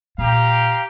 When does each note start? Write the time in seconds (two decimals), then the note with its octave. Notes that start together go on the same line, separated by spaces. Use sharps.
0.18 A#2 G4 F5 A#5